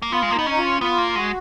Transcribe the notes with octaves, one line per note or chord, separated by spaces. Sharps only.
A#3
B3 F4
G#3
A#3
B3 D#4
C#4 D#4
F4
B3 F4
A#3
G#3 F#4